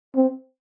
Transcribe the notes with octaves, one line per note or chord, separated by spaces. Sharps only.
C4